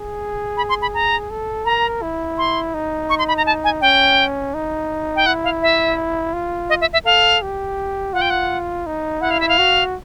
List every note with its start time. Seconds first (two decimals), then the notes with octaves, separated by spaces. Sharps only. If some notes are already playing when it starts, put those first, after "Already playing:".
Already playing: G#4
0.57 B5
0.69 C6
0.82 B5
0.94 A#5
1.30 A4
1.65 A#4 A#5
2.02 E4
2.38 C6
2.74 D#4
3.10 C#6
3.19 C6
3.28 B5
3.37 A#5
3.46 A5
3.64 G#5
3.81 C#4 G5
4.54 D#4
5.16 G5
5.26 E4 F#5
5.44 F5
5.62 E5
6.33 F4
6.69 D#5
6.81 E5
6.93 E5
7.05 A4 F5
7.42 G4
8.13 F4 F#5
8.21 G5
8.30 F#5
8.86 D#4
9.21 E4 F#5
9.31 F5
9.40 E5
9.49 F5
9.58 F#4